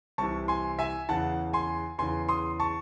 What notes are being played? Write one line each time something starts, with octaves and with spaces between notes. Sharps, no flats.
C2 C3 E3 A5 C#6
G#5 C6
E5 G#5
E2 C#3 E3 F#5 A5
G#5 C6
E2 C#3 E3 G#5 C6
C6 D#6
A5 C#6